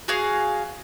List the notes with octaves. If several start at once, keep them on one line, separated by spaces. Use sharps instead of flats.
F#4 G#4 F5